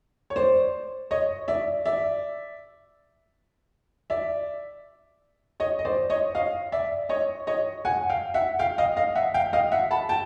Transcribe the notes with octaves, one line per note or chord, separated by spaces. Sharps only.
C#5
C5 D5
C#5 D#5
D5 E5
D5 E5
D5 E5
C#5 D#5
D#5
C5 D5
C#5 D#5
D#5 F5
D5 E5
C#5 D#5
C#5 D#5
F#5 G#5
F5 G5
E5 F#5
F5 G5
D#5 F5
D#5 F5
E5 F#5
F5 G5
D#5 F5
E5 F#5
A5 B5
G5 A5